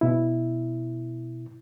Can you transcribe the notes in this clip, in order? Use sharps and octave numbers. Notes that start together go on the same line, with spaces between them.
B2 E4